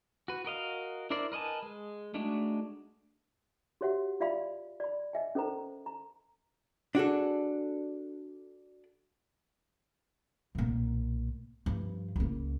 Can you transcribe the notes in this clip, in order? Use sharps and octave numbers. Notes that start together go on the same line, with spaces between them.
F#4 B4
F#4 A#4 D#5 F5
D4 E4 A#4 C5 D5
A#4 B4 D#5 G#5 A5
G#3
G#3 A3 D4 D#4 F#4
F#4 G4 C#5 E5 F#5
F4 D5 E5 F5 B5
D5 B5
D#5 E5 G#5
C#4 A4 A#4 C5 A#5
A#5
D4 F#4 G#4 A4
B1 A#2
G2 F3
C#2 A#3